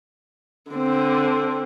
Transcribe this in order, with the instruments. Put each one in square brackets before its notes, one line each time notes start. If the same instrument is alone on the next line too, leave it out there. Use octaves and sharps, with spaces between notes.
[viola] D3 C4